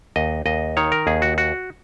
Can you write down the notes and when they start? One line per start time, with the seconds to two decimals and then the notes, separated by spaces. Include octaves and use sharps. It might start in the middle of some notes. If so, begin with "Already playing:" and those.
0.16 D#2 D#5
0.46 D#2 D#5
0.77 D#3 C#5
0.92 A#4
1.07 D#2 G#4
1.22 F#4
1.38 F#4